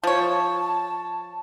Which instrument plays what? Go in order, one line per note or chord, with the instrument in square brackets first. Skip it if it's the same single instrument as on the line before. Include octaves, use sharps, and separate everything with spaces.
[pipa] F3 C#5 [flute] A5